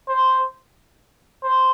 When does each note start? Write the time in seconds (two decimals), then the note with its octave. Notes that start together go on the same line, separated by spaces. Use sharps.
0.09 C5
1.43 C5